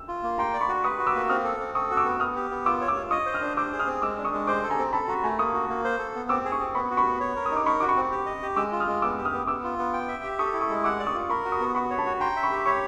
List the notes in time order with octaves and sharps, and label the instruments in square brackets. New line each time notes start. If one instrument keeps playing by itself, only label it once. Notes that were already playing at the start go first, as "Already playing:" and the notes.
Already playing: [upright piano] E6
[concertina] F4
A#3
[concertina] G5 [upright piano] A#5 C6
[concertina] D5
[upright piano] B5 C#6
[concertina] F#4
[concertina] B4 [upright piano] C#6 D#6
[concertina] F#4
[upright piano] D6 E6
[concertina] A#3
[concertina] C4 [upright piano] D#6 F6
[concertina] A4
C4
[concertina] A4 [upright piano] C#6 D#6
[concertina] F#4
[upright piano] D6 E6
[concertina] B3
[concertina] B3 [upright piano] D#6 F6
[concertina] G4
B3
[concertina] F4 [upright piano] D6 E6
[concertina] C#5
[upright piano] D6 E6
[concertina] F4
[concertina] D#5 [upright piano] C#6 D#6
[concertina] C5
[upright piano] D#6 F6
[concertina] D4
[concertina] C5 [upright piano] D6 E6
[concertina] G#4
[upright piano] D#6 F6
[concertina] C4
[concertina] G#3 [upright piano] D6 E6
[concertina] D4
[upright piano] C#6 D#6
[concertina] G#3
[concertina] C5 [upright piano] C6 D6
[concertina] A4
[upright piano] G#5 A#5
[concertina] C4
[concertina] A4 [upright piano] A5 B5
[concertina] F#4 [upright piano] A#5 C6
[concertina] A3 [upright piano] G#5 A#5
[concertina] A#3 [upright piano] C#6 D#6
[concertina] F#4
A#3
C5
A4
B3
[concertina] C4 [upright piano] D6 E6
[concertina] G#4
[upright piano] C#6 D#6
[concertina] C4
[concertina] B3 [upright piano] B5 C#6
[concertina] F#4
[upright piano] B5 C#6
[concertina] B3
C#5
A#4
[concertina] D#4 [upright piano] D#6
[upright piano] D6
[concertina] A#4 [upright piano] B5 C#6
[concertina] F#4 [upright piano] D6
[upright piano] B5 C#6
[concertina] C4
G4
D#5
G4
[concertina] G#3 [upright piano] D6 E6
[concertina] F4
[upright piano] D#6 F6
[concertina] G#3
[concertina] B3 [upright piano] D6 E6
[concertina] G4
[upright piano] D#6 F6
[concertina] B3
[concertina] B3 [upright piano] D6 E6
[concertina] F4
B3
G5
E5
G4
[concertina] A4 [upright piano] C#6 D#6
[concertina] E4
[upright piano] C#6 D#6
[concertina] G#3
[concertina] F#5 [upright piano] D6 E6
[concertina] D5
[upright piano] C#6 D#6
[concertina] F4
[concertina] A#4 [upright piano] B5 C#6
[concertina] F#4
[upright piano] C#6 D#6
[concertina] B3
[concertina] F#4 [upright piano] B5 C#6
[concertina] C#5
[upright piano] A5 B5
[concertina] F#4
[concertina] G5 [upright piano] A#5 C6
[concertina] E5
[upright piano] B5 C#6
[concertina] G4
[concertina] C#5 [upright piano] B5 C#6